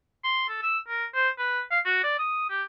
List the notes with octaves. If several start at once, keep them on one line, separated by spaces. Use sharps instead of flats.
C6
A4
E6
A#4
C5
B4
F5
F#4
D5
D#6
G4